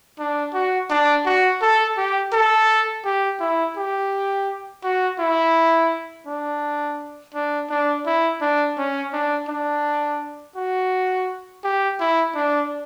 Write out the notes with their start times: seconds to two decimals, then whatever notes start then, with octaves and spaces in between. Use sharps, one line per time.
0.19 D4
0.54 F#4
0.90 D4
1.25 F#4
1.62 A4
1.98 G4
2.33 A4
3.05 G4
3.40 E4
3.77 G4
4.84 F#4
5.19 E4
6.27 D4
7.34 D4
7.70 D4
8.06 E4
8.41 D4
8.78 C#4
9.13 D4
9.48 D4
10.56 F#4
11.64 G4
12.00 E4
12.35 D4